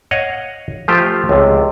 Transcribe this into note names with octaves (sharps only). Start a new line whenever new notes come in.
C#5 D#5 F5 F#5
F3 A3 F4 G4 C5
C#2 C3